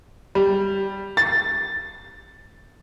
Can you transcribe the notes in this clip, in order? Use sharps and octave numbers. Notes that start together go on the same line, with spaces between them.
G3
A6